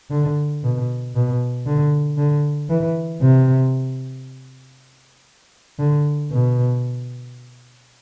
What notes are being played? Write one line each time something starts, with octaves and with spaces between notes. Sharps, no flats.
D3
B2
B2
D3
D3
E3
C3
D3
B2